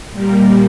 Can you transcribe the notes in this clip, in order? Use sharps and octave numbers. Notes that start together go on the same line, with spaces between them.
A#2 G3 A#3